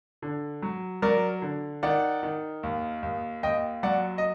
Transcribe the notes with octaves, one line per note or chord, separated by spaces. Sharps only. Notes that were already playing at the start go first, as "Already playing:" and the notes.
D3
F#3
F#3 A#4 D5
D3
D#3 D5 F#5
D#3
D#2
D#2
D#2 D#5 G5
F#3 D5 F#5
D#5